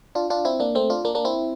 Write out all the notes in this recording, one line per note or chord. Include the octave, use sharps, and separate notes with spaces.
D4 F4
D4 F4
C4 E4
A#3 D4
A3 C4
D4 F4
A#3 D4
A#3 D4
C4 E4